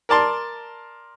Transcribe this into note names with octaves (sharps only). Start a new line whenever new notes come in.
A#4 D5 A5 C6